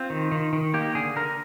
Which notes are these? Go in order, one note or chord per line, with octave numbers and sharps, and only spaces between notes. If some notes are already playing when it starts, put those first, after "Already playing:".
Already playing: C4 F4
D#3
D#3
D#3
A#3 G4
D3 G#4
D3 A#4